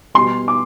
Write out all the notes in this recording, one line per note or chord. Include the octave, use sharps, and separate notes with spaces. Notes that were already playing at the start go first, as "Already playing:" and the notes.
B2 G3 B3 C6
D6